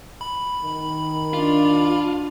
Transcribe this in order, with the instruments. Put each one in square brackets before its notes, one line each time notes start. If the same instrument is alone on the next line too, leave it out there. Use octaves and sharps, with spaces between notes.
[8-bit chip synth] B5
[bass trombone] D#3
[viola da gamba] D4 [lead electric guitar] F4